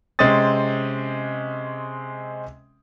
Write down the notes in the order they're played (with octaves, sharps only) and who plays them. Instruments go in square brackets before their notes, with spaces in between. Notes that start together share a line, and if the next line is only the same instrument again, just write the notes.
[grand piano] C3 G#3 C4 C#4 D#6 A6